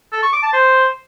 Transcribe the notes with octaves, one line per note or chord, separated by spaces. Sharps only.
A4
C#6
D6
A5
C5